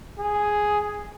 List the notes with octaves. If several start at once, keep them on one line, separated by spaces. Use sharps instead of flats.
G#4